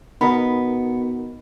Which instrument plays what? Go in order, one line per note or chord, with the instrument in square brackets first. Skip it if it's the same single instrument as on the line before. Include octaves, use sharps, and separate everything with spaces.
[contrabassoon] B2 [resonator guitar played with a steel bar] B3 [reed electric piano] D#4 A#4 D#5 [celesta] B5